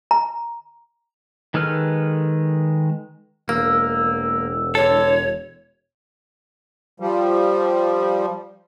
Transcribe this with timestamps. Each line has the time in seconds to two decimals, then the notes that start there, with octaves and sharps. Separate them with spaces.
0.11 A#5
1.54 D#3 G#3 A4 B4 F6
3.49 E1 A#3 E6
4.75 D3 A4 C#5
7.00 F3 G3